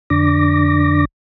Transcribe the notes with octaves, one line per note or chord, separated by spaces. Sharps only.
F2 D3 D4 D6 A#6